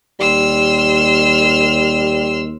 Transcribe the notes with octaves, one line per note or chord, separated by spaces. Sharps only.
D#2 G3 C6 E6 F6